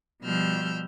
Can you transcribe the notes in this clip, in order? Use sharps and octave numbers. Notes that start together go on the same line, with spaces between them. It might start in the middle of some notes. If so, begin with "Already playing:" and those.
B2 F3 G3 E6 F6 G6